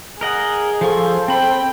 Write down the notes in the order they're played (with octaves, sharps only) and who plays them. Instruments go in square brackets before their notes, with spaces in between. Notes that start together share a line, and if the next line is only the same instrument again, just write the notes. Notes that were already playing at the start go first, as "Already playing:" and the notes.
[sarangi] G#4 [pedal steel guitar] A#4 D#5 F#5
[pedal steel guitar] F3 F4 C#6 [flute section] A4 C5
[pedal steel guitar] C4 B5 [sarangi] G5